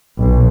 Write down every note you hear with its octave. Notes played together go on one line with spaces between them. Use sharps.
B1